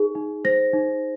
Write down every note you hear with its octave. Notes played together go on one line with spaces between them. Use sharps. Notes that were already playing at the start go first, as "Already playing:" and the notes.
Already playing: D#4 G#4
D#4
C5 A#6
D#4